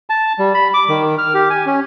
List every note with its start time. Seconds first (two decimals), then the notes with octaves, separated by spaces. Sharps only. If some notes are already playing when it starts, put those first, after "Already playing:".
0.10 A5
0.39 G3
0.54 B5
0.74 D6
0.89 D#3
1.18 F6
1.34 G4
1.50 G#5
1.66 C#4